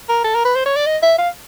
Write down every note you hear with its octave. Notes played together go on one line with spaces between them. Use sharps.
A#4
A4
A#4
B4
C5
C#5
D5
D#5
E5
F5